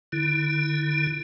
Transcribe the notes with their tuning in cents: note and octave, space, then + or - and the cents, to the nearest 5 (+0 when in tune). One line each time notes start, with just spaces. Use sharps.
D3 +20 E4 +0